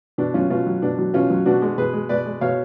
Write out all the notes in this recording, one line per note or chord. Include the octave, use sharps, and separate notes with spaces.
B2 D4
F#3 C#4 F4
B2 C#4 F4
F#3
B2 D4
F#3
B2 C#4 F4
F#3
B2 D4 F#4
G#3
B2 G#4 B4
G#3
B2 B4 D5
G#3
B2 C#5 F5